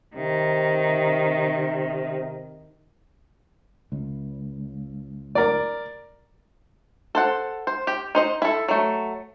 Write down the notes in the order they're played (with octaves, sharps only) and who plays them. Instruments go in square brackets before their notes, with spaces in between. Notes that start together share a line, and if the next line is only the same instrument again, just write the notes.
[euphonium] C3 [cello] D#3
[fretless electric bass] C#2
[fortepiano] A#4 D5
[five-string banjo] A4 C5 F#5
C5
G4
D#4 C5 D#5
E4 A4
F#3 A3